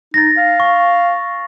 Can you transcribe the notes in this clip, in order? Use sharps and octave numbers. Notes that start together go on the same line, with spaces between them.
D#4 A6 A#6
F5
C#6